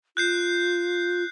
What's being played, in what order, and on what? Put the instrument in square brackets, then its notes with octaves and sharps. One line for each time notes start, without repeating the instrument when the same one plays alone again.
[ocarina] F4 [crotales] F#6 G6 C7